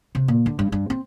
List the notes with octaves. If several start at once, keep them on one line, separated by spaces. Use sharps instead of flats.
C3
A#2
D3
G2
G2
C4